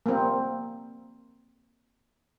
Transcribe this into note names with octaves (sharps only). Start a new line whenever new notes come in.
A#3 C4